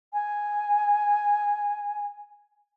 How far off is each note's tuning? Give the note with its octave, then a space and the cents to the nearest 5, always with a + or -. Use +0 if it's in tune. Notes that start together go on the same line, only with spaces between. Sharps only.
G#5 -5